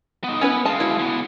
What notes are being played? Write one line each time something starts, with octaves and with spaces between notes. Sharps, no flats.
B3 D#4
B3 C#4 E4 B4
G#3 F5 A5
E4 F#4
C#3 B3